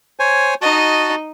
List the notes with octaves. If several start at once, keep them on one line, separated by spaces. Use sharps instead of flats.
C5 C#5 G#5
D#4 F#4 D#5 A5